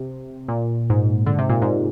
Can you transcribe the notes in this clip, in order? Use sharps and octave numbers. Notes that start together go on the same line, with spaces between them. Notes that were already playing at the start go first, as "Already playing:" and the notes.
Already playing: C3
A#2
G#2
D3
C3
A#2
G#2